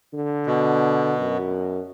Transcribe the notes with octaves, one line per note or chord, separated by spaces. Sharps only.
D3
B2
F#2